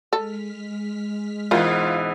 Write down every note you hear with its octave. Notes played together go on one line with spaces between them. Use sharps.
G#3 A4 F6 B6
G#2 B2 E3 E4 F4 A#4